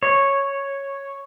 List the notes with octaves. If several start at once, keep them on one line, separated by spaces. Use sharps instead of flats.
C#5